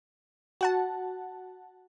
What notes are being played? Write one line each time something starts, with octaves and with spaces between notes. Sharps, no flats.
F#4 F#5 A5